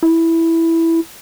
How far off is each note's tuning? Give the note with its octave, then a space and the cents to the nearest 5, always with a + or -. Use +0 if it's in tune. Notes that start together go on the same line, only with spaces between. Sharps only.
E4 +0